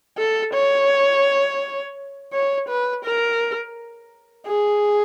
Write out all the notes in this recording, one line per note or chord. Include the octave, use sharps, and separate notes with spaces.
A4
C#5
C#5
B4
A#4
G#4